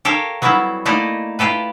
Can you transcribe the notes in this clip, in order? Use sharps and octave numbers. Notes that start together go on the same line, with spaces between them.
G4 A4 A#4 C#5 F5
F#3 G3 B3 C4 E4
A3 A#3 D#4 E4 D5 D#5
E4 F4 G4 A4 B4